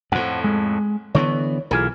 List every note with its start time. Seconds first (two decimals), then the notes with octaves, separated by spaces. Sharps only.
0.12 F2 A2 C5 F#5
0.44 G#3
1.15 D3 E3 B3 C#5
1.71 B1 E3 F4 G#4 A#4